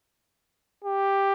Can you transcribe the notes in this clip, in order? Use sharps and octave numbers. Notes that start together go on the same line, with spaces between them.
G4